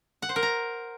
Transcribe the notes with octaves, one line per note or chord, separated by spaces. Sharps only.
F#5
C5
A#4
A#5